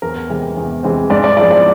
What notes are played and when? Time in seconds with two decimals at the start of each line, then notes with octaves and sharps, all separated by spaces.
0.02 E2 A#4
0.30 C3 E3 G#3 C4
0.57 E2
0.83 C3 E3 G#3 C4
1.10 G#2 D5
1.24 D5
1.37 F3 G#3 C4 E4 D5
1.51 D5